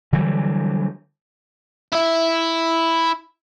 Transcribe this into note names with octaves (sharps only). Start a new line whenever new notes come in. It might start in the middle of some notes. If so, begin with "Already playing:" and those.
D3 E3 F#3 G3
E4 E5